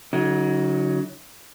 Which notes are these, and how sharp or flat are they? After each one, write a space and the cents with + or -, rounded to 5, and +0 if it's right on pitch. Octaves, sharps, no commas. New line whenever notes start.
D3 -40 F#3 +0 D#4 +35